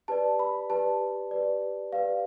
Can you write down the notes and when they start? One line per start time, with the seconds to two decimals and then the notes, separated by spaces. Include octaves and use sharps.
0.08 G4 B4 D5 A5
0.39 B5
0.70 G4 B4 D5 A5
1.31 G4 B4 D5
1.93 G4 B4 D5 F5